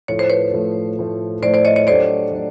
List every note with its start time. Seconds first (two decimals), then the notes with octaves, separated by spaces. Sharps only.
0.08 A2 F3 A3 C#5
0.19 C5
0.30 B4 C#5
0.54 A2 F3 A3
0.98 A2 F3 A3
1.42 A2 F3 A3 C5 D5
1.54 C5 D5
1.65 C#5 D#5
1.76 C#5 D#5
1.87 F#3 A3 D4 G4 C5 D5
2.32 F#3 A3 D4